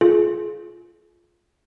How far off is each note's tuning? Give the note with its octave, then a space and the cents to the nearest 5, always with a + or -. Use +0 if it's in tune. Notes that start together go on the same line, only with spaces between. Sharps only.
F4 +0 G#4 +30